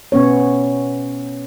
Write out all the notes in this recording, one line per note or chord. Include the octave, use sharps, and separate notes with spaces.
B2 B3 C#4 C#5